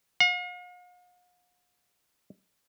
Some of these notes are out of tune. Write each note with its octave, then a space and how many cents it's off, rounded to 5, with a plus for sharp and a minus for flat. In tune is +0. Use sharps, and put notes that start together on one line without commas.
F5 +45